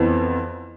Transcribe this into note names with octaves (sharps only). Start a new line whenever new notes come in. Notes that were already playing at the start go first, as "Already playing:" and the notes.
Already playing: F2 E3 B3